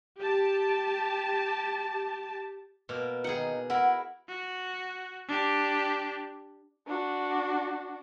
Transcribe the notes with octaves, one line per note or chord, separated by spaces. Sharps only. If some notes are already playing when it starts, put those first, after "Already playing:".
G4 A5
B2 A#3
D#3 D#4 G#4 F#5
E4 A#4 F#5
F#4
D4 G4
D4 F#4